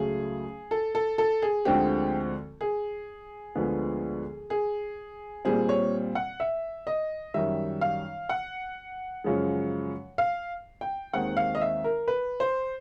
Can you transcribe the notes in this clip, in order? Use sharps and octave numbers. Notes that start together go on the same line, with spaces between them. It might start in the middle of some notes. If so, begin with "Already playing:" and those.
Already playing: C#2 C#3 F#3 A3 G#4
A4
A4
A4
G#4
D2 D3 F3 G#3 C4 G4
G#4
D2 D3 F3 G#3 B3
G#4
A#2 G3 C4 G#4
C#5
F#5
E5
D#5
F#2 D#3 G3 E5
F5
F#5
F#2 C#3 F3 G#3
F5
G5
D#2 D#3 G#3 C4 F#5
F5
D#5
E5
A#4
B4
C5